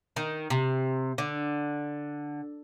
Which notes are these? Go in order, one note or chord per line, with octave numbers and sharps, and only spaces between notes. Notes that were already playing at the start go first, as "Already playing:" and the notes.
D#3
C3
D3